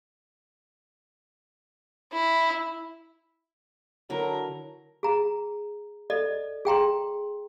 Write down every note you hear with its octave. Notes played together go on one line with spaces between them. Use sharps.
E4
D3 F#3 E4 A#4
G#4 A#5
A4 D5 D#5
G#4 G5 A#5 C6